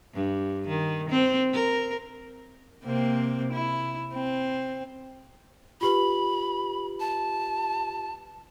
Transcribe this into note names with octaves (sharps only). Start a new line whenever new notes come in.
G2
D#3
C4
A#4
C3 A#3 C4
E4
C4
F4 G4 B4 B5
A5